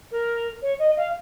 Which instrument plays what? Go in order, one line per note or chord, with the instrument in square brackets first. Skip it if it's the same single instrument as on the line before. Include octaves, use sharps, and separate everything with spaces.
[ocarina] A#4
C#5
D#5
F5